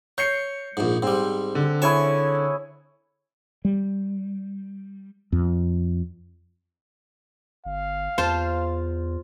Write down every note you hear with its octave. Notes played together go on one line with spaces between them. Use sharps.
C#5 G6 C7 C#7
A#1 G#2
G#2 G3 C4
D3
E4 G#4 C#5 G#5 A5
G3
F2
G1 F5
E2 F4 C5 A5